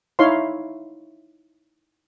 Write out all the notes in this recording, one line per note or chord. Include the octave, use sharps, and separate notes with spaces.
D#4 E4 C#5 E5 F5 C6